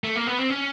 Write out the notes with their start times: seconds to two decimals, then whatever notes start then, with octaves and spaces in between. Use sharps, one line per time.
0.04 A3
0.16 A#3
0.27 B3
0.39 C4
0.50 C#4